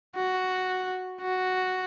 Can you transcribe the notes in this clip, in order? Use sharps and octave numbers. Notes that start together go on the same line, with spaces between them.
F#4
F#4